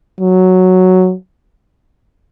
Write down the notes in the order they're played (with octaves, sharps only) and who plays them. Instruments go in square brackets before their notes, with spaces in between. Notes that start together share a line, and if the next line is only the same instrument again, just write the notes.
[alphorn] F#3